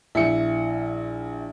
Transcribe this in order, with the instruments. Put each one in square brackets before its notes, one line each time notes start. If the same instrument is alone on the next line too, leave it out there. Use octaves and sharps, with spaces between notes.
[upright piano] A#1 C#7 [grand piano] E4